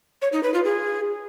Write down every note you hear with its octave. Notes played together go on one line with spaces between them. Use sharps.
C#5
D#4
B4
F4
G#4